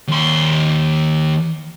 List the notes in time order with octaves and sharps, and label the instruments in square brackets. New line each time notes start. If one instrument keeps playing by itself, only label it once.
[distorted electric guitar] D#2 C6